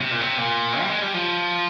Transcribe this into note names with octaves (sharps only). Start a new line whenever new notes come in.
C3
A#2
C3
A#2
G3
G#3
G3
F3